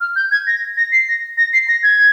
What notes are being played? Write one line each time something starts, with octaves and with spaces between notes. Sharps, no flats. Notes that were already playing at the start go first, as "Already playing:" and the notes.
F6
G6
G#6
A#6
A#6
C7
A#6
A#6
C7
A#6
G#6